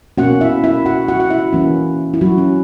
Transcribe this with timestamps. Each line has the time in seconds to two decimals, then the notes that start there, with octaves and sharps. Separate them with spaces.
0.18 B2 A#3 C#4 F#4 F#5
0.41 E4 E5
0.64 E4 E5
0.86 F#4 F#5
1.08 F#4 F#5
1.20 F#5
1.30 E4 E5
1.53 E3 A#3 C#4
2.14 E4
2.21 F#3 F#4
2.38 C#4